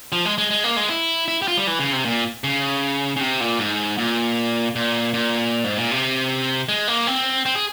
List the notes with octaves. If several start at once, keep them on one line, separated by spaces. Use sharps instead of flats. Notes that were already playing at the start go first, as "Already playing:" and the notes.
F3
G#3
G#3
G#3
A#3
G#3
E4
E4
G4
F4
G3
E3
C#3
C3
A#2
C#3
C#3
C3
A#2
G#2
A#2
A#2
A#2
G#2
A#2
C3
G#3
A#3
C4
C4
G#4